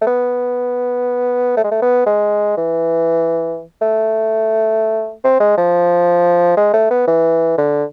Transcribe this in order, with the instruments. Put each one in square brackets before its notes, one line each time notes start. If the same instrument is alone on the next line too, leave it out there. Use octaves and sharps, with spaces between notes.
[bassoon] A3
B3
A3
G#3
A3
B3
G#3
E3
A3
C4
G#3
F3
G#3
A3
B3
E3
D3